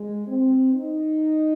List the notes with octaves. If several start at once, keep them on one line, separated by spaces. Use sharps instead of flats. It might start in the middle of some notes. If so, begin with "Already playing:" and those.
Already playing: G#3
C4
D#4